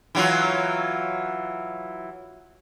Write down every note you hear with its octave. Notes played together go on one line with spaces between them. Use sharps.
E3 F#3 F4